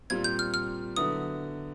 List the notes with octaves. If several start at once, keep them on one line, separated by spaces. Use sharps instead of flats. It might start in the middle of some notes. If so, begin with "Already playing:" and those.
A#2 G3 C4 F4 G#6
G6
F6
F6
D3 F#3 B3 E4 D#6